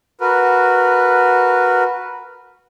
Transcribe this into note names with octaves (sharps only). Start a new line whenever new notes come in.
F#4 A#4 B4